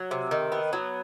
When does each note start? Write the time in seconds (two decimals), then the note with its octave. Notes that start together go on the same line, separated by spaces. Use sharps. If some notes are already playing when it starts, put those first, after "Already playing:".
Already playing: F#3
0.11 C3
0.31 D#3
0.52 B3
0.73 F#3